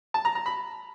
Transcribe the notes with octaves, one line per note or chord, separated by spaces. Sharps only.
A5
A#5
A#5
B5